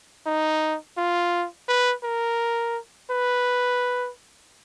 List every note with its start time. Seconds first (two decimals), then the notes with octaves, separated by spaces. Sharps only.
0.26 D#4
0.97 F4
1.69 B4
2.04 A#4
3.11 B4